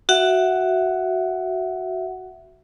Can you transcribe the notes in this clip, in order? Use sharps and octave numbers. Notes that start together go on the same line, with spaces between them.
F#4 E5 F#5